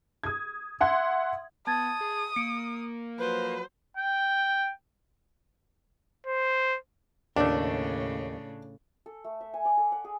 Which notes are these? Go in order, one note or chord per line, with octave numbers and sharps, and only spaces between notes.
D#6 G#6
E5 F#5 C6 G#6
B3 A5 D#6 G#6 A6
G#4
A#3 C#7 D7
F3 F#3 B4 C5
G5
C5
D#2 A2 C#3 A3 D4
A4
A3
E5
G#5
D5
A4
F#5
G#4